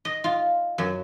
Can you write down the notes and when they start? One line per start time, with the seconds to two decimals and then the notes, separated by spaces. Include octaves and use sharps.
0.05 D#5
0.24 F4
0.78 F#2